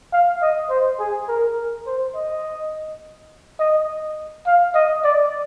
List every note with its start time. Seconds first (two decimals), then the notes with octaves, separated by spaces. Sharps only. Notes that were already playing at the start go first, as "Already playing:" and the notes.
0.12 F5
0.42 D#5
0.70 C5
0.99 G#4
1.28 A#4
1.86 C5
2.15 D#5
3.59 D#5
4.46 F5
4.74 D#5
5.04 D5